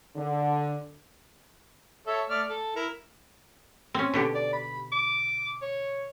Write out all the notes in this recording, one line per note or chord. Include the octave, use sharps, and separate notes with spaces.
D3
A4 C#5 E5
A3 D5 F6
A4
E4 A#4
C4 C#4
B2 D3 G4
D5
B5
D6
C#5